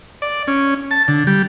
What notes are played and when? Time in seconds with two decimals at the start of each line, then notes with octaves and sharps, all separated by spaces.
0.22 D5
0.47 C#4
0.91 A5
1.08 D3
1.27 G3